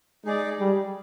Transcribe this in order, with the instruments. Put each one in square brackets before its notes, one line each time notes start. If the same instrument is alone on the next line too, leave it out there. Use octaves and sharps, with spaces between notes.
[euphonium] G#3 [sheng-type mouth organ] D#4 G#4 D5
[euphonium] G3